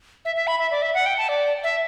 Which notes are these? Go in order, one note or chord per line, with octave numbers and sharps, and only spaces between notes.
E5
E5
B5
E5
D5
E5
F#5
G5
A5
D5
E5